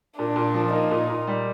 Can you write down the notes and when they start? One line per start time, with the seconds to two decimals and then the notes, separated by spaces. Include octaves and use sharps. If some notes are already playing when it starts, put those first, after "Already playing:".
0.18 A#2 D4
0.36 A#2
0.54 F3
0.72 A#3 D#4
0.91 A#2
1.09 A#2
1.27 G3